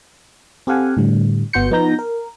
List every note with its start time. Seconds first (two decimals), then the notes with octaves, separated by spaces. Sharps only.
0.67 C4 G4 A4 F5 F#5 G#5
0.97 A2 D3 G3
1.53 G1 B3 F#4 C6 G6 C#7
1.71 F3 B3 D#4 A#5 G6 A#6
1.99 A#4